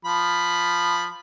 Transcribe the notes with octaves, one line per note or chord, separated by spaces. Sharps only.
F3 B5